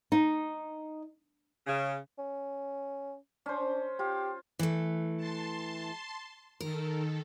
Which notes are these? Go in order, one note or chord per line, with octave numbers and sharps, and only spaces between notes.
D#4
C#3
C#4
C#4 D4 C5
F4 G4
E3 A3
A5 C6
D#3 A4 A#4